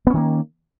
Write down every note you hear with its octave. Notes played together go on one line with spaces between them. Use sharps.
D#3 A#3 B3 C#4